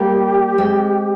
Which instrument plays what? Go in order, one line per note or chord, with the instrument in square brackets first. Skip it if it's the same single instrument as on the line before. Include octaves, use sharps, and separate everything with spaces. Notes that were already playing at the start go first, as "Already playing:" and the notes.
Already playing: [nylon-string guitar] G3 A#3 [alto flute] G4
[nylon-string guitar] G#3 C4